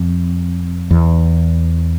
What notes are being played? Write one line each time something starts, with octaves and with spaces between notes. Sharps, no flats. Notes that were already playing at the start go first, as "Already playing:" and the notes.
Already playing: F2
E2